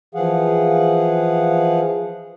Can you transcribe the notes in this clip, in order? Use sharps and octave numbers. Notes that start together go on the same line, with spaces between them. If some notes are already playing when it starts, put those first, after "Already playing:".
E3 F3 G#4 F5 F#5